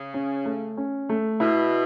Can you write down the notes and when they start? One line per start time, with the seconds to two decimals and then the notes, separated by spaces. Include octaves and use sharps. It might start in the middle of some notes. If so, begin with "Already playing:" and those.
Already playing: C#3
0.14 C#4
0.45 A3
0.77 C#4
1.09 A3
1.40 B2 E4